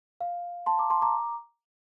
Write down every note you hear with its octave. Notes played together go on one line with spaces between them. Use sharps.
F5
A5 C6
A#5 D6
A5 C6
A#5 D6